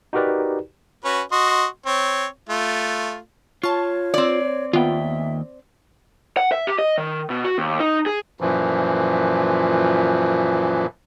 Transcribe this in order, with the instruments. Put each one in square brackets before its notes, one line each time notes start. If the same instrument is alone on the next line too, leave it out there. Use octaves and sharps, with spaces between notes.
[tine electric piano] D#4 F#4 G4 A#4 B4 D5
[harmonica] C#4 F#4 B4
F#4 D#5 C6
C4 C#5
A3 F4
[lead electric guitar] F4 [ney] C#5 [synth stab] A5 C#6
[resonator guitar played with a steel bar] C4 D5
[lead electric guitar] D#2 G5 [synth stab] B3 F4 [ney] E5
[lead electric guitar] F#5
E5
G4
D#5
D#3
B2
F#4
D#2
D#4
G#4
[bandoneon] F#2 A#2 E3 F3